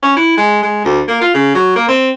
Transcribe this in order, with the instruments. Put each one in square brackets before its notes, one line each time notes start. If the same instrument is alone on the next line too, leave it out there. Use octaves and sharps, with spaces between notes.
[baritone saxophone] C#4
E4
G#3
G#3
D2
A#3
F4
C#3
F#3
A#3
C4